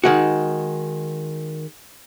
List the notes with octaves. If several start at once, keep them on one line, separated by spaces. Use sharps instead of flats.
D#3 G#3 F#4